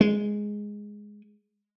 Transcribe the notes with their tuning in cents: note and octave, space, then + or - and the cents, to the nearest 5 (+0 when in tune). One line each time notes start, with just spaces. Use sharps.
G#3 +0